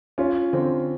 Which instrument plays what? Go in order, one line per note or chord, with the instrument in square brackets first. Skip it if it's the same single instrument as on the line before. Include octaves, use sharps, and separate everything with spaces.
[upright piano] C#4 [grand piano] F4
[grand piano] D3 [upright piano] C4